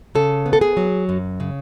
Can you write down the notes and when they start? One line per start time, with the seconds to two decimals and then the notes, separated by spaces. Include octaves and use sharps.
0.15 C#3 A4
0.46 B3
0.53 A4
0.61 G#4
0.77 F#3
1.09 F#2
1.40 C#3